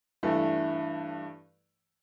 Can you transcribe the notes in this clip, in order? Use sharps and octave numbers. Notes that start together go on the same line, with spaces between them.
G2 E3 A3